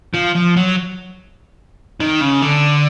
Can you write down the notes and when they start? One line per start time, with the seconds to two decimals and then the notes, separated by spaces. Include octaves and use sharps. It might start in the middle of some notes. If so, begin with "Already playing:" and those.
0.14 F3
0.36 F3
0.57 F#3
2.01 D#3
2.21 C#3
2.42 D3